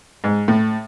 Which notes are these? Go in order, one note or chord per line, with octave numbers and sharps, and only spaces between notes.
G#2
A2